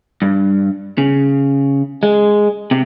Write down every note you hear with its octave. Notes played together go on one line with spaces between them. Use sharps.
G2
C#3
G#3
C3